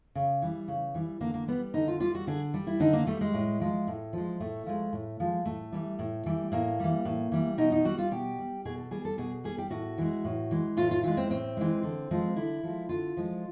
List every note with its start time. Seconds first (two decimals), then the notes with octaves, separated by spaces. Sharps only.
0.15 C#3
0.42 E3 G3
0.68 C#3
0.94 E3 G3
1.20 D3 A#3
1.34 A#3
1.48 G3 B3
1.74 D3 D#4
1.88 F4
2.00 G3 F4
2.15 F#4
2.27 D3 G#4
2.54 G3
2.67 E4
2.80 D3 D#4
2.93 A#3
3.07 G3 A3
3.21 G#3
3.34 A2
3.60 F3 G#3
3.87 A2
4.13 F3 G#3
4.40 A2 A3
4.66 F3 G#3
4.93 A2
5.20 F3 G#3
5.45 A2 A3
5.72 E3 G3
5.99 A2
6.26 E3 G3
6.52 A2 A#3
6.79 E3 G3
7.05 A2
7.32 E3 G3
7.58 B2 D#4
7.72 D#4
7.85 G3 F#4
7.98 F4
8.11 B2 G4
8.39 G3
8.65 B2 G#4
8.78 A4
8.91 G3 G#4
9.05 A4
9.18 B2 G#4
9.44 G3 G#4
9.58 G4
9.70 A2 F#4
9.98 E3 G#3
10.25 A2
10.51 E3 G#3
10.77 A2 F4
10.91 F4
11.03 E3 G#3 F4
11.17 C4
11.30 A2 C4
11.57 E3 G#3
11.83 D3
12.11 F3 G#3
12.36 D3 E4
12.63 F3 G#3
12.89 D3 F4
13.17 F3 G#3